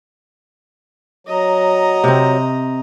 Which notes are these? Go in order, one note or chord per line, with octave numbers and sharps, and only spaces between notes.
F#3 D#5 A#5
C3 C4